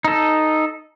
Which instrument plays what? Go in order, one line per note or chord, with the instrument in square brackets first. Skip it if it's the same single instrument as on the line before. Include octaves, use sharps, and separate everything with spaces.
[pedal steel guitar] D#4 A4